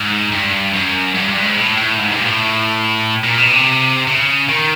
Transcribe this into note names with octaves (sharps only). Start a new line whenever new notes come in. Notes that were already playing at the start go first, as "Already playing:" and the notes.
Already playing: G#2
G2
F#2
G2
G2
G#2
A2
A2
G#2
G2
A#2
A2
A#2
B2
C3
C#3
D#3